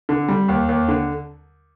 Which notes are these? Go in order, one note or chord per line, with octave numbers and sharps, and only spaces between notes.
D3
G3
D#2
D#2
D3